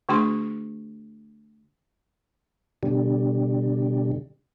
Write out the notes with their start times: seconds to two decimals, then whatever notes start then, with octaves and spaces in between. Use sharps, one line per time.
0.09 D3 A3 D4 F#4 G#4 C6
2.83 B2 D3 G3